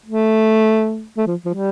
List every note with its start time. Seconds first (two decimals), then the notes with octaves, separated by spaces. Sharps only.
0.06 A3
1.17 A3
1.27 F3
1.46 F3
1.54 G3